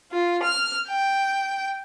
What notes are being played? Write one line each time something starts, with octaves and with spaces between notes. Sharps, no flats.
F4
F6
G5